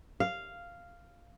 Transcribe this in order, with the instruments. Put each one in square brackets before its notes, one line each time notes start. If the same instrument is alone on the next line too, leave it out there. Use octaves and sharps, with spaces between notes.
[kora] F5